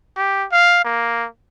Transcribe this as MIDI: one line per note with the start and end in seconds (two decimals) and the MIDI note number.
0.17 0.46 67
0.52 0.83 77
0.85 1.27 58